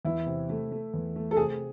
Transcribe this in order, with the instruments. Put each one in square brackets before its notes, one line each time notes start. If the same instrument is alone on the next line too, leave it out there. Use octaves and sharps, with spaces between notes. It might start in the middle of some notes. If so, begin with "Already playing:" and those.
[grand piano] E2 [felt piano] E4
[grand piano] C3
A3
A3
E2
A3
[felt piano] A4
[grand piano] C3 [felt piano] G#4